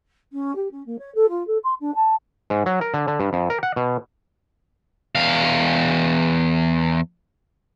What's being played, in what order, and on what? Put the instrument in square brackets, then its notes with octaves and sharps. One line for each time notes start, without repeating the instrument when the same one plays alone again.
[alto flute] C#4
G4
C#4
A#3
C#5
A4
F4
A4
C6
D4
A5
[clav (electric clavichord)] G#2
F#3
A#4
D3
D3
G2
F2
A#4
F#5
B2
[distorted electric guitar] E2 F5